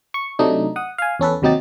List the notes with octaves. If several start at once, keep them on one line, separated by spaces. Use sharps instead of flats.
C#6
C3 F#3 A3 D4 D#4
F#5 D#6
F5 G#5
E2 C#4 A4 B4
D#2 C3 F#3 D#4 G4 A6